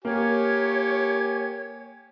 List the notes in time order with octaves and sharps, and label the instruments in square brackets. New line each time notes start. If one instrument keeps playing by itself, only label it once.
[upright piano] A#3 [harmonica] G4 G#5 [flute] C#5